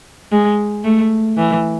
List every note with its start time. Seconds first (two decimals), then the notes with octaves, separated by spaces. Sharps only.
0.32 G#3
0.84 A3
1.37 E3